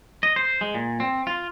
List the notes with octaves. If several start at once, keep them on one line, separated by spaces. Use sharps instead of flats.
D#5
C5
G#3
A#2
C4
F4